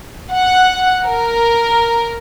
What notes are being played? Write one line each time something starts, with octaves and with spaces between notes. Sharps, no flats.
F#5
A#4